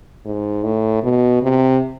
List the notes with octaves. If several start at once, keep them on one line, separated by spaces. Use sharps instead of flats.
G#2
A2
B2
C3